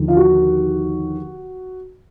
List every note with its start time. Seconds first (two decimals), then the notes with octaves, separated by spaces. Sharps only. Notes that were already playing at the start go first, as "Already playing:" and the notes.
Already playing: D#2 D3 F3
0.08 F4
0.17 F#4